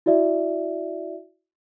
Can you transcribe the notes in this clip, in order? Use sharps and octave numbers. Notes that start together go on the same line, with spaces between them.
E4 F#4 D5 E5